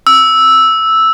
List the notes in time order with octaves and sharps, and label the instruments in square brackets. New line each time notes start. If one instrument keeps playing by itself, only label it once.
[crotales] E6